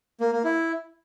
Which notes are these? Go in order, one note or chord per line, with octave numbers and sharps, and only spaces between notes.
A#3
A#3
E4